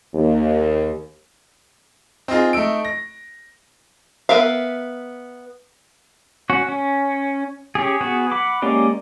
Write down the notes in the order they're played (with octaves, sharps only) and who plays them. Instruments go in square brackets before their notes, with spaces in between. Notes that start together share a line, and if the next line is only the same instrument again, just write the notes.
[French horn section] D#2
[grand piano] C4 D#4 F4 G#4
A3 D#4 E6 D7
A#6
[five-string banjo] B3 A#4 E5 F5
[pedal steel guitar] C#4 F#4
C#4
C#4 G4 G#4
B3 F#4 G#4
F#5 B5 D6
G#3 A#3 C#4 G4 D5